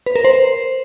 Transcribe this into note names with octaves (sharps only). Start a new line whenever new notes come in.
B4
A#4
C5